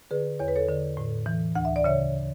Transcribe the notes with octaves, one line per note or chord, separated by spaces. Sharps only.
D3 G#4 B4
E2 C#5
B4
A4 C#5
D3
A2
E3
D2 F#5
E5
D5
C#3 C#5 E5